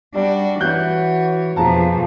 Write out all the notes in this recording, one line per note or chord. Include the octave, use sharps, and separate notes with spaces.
G3 D4 F#4 D5
E3 F#4 C#5 F#6 G6
F2 B2 F3 G#4 A5 A#5